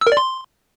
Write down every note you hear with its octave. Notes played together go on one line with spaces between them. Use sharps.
E6
A#4
D5
C6